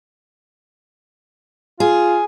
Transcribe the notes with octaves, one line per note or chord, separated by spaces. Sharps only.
F4 G#4